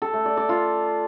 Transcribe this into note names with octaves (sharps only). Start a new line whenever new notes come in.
A4
A3
D5
D5
F4